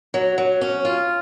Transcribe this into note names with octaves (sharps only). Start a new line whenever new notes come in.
F#3
F#3
C#4
F4